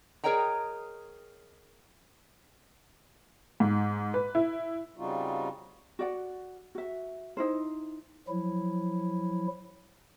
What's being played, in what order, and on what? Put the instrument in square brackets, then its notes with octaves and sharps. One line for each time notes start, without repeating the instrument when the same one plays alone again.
[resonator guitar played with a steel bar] G#4 A#4 C#5 D#5 G5 A#5
[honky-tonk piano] G#2
B4
E4
[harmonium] C#3 G3 C4 D#4 F4 F#4
[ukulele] F#4 D5 F#5
F#4 E5
D#4 E4 C5
[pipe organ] F3 F#3 E4